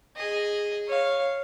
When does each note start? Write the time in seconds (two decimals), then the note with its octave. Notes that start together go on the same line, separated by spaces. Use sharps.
0.16 G#4 D#5
0.87 C#5 F5